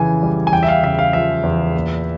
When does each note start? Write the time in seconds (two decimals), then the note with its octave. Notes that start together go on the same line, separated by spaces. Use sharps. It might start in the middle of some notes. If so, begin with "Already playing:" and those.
Already playing: F2 C#3 E3 G#5
0.23 G3
0.47 G#5
0.52 E2 G5
0.63 E5
0.68 F5
0.83 C#3 E5
0.99 F5
1.13 F3 E5
1.43 E2
1.74 A#2